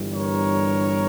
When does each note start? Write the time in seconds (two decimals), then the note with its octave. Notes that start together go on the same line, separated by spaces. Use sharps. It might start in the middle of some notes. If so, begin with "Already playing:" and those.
Already playing: G1 G2 E3 G3
0.15 A#4 C#5